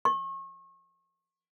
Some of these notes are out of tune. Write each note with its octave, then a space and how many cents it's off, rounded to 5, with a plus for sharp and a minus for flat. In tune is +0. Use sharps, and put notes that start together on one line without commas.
C#6 -35